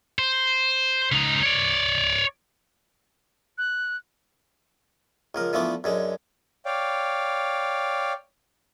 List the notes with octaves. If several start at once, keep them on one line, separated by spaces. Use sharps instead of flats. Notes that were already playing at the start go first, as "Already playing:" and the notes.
C5
C#2 D#4
C#5 D5
F#6
C#2 F3 A#4
D3 E3 F3 A3 B3 D5
F#2 D3 G#3
C#5 D5 F5 G5